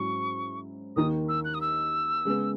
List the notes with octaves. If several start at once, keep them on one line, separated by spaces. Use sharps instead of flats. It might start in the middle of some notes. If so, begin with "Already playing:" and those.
Already playing: G#2 F#3 C#4 E4 C#6
D#2 D#3 A#3 D#4 D#6
E6
F#6
D#6
E6
C#3 G#3 B3